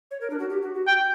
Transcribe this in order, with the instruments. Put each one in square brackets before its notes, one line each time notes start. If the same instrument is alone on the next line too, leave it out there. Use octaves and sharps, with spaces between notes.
[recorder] C#5
A#4
D4
F#4
G4
F#4
F#4
[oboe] G5